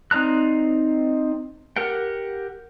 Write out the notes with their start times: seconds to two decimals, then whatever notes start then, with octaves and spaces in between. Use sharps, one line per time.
0.11 C4 D#4 D5 A#5 F#6
1.76 G4 A#4 F#5 G5